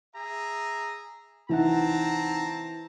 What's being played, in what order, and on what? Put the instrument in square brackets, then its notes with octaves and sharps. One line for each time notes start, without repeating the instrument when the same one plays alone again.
[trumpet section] G#4 E5 A#5
[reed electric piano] C2 D#4 F#5 [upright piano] E3 [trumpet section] C4 A5 A#5